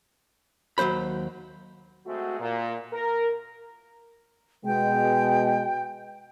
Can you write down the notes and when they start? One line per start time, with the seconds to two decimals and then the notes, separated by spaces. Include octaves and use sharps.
0.78 D#2 F#3 A3 C5 B5
2.06 G#3 A3 C4 F#4
2.40 A#2
2.93 A#4
4.65 B2 G#3 G5